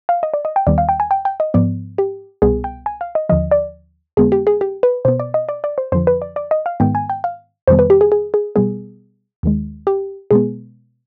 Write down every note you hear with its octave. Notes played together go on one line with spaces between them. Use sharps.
F5
D#5
D5
D#5
G5
D#2 D#3 G3 B3 D5
F5
G5
G#5
G5
G5
D#5
G#2 F3 B3 D5
G4
C2 B2 G3 B3 G#4
G5
G#5
F5
D#5
D#2 D3 F3 D#5
D5
F2 D3 G#3 B3 G#4
G4
G#4
G4
B4
B2 B3 C5
D5
D#5
D5
D5
C5
F2 D3 F3 C5
B4
D5
D5
D#5
F5
G#2 D#3 G#3 B3 G5
G#5
G5
F5
F2 C3 D#3 G3 B3 C5
B4
G4
G#4
G#4
G#4
B2 G3 B3 G#4
D#2 D#3 G#3
G4
B2 G#3 B3 G#4